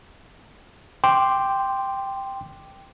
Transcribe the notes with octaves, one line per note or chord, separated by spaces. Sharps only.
G5 C6 D6